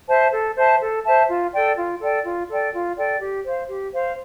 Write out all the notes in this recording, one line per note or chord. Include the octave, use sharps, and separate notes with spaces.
C5 E5 A5
A4
C5 E5 A5
A4
C5 E5 A5
F4
A4 D5 G5
F4
A4 D5 G5
F4
A4 D5 G5
F4
A4 D5 G5
G4
C5 F5
G4
C5 F5